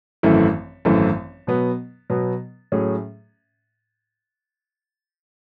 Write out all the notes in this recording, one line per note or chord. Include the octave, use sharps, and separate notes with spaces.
G#1 F#2 E3 A3 E4
G#1 F#2 E3 A3 E4
B2 F#3 B3
B2 F#3 B3
A2 F#3 A3 C#4 G#4